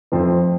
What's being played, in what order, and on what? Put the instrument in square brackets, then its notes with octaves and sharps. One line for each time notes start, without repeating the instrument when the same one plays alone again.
[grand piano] F2 F3 A3 C4